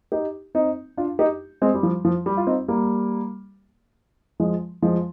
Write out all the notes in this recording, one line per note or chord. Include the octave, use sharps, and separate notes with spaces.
D#4 G4
C4 D#4
D4 F4
D#4 G4
G#3 C4
G3
F3
F3
G3
F4
C4 D#4
G3 A#3
F3 G#3
F3 G#3